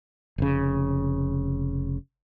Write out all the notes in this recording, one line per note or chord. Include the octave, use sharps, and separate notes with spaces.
F1 C#3